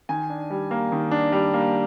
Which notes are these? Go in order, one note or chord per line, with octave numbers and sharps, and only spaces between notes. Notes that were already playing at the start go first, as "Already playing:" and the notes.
D#3 G#5
D4
G3
A#3
D#3
D4
G3
A#3